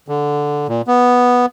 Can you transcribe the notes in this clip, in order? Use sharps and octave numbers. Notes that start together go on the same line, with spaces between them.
D3
A#2
B3